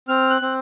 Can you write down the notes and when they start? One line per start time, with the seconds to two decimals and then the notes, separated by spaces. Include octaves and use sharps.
0.08 C4 F6
0.30 F#6
0.42 C4